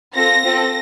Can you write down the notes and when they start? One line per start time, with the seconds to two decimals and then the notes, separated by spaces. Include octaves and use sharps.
0.16 C4 F4 A4 A#6
0.44 C4 F4 A4